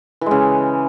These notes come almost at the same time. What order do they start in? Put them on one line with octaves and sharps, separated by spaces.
E3 G#3 C#3